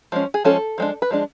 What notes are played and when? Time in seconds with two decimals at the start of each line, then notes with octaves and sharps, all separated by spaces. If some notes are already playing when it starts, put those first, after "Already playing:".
0.12 F3 G#3 C#4
0.34 G#4
0.45 F3 G#3 C#4 A4
0.78 F3 G#3 D4
1.02 B4
1.10 F3 G#3 D4